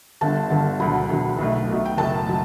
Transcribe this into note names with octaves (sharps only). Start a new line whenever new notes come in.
G1 G2 D3 A5
G1 G2 D3
E1 D2 D3 F#3 B5
E1 D2 D3 F#3
B1 B2 A3
B1 B2 A3
G5
F#1 F#2 F#3 A3 A5
F#3